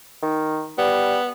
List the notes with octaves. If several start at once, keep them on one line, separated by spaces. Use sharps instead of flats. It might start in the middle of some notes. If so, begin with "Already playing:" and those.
D#3
G3 B3